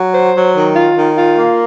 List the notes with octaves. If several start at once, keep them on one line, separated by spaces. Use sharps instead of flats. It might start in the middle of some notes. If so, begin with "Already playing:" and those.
Already playing: F#3
C5
F#3
D#3
F4
D#3
F4
A#3